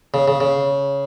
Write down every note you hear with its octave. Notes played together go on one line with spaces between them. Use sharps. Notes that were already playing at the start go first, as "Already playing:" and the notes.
C#3
C#3
C#3